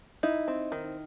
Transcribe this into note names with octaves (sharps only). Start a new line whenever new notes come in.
D#4 E4
C4
D#3